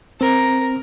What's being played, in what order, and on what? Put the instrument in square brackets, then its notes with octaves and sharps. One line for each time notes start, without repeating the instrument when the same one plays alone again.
[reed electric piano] C4 [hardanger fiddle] A#4